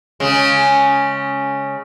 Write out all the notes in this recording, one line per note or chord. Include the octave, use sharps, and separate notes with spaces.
C#3 G#3